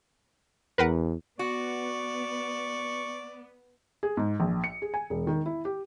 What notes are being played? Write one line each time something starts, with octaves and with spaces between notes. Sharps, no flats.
E2 A#4 B4 F#5
B3 F#4 D5 C#6
G#4
G#2
A#1
C#7
G#4
G#5
E1
D#3
E4
G4